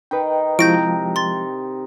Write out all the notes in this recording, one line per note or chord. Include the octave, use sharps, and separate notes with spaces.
D#3 D#4 B4 G5
C3 F3 G#3 E4 A#5 G6 A#6 D7
C6 A6